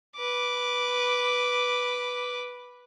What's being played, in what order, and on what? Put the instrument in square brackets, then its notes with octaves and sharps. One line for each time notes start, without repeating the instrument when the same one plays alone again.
[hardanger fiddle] B4 D6